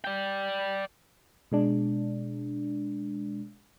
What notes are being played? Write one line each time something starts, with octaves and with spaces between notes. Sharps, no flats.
D5 G5
B2 G#3 D4